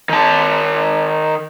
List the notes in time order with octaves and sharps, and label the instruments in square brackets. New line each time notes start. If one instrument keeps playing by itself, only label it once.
[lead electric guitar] D#3 A5